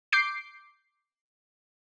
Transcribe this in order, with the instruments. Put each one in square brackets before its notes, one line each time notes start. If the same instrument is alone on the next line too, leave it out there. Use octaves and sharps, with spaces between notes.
[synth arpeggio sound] D6 G6 C7 D7